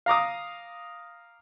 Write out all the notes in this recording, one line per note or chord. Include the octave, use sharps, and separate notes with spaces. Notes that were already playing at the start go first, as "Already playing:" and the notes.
F5 A#5 D6 D#6